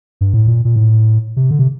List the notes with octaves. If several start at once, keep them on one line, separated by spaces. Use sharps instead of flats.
G2
A2
A#2
A#2
A2
C3
D3
C3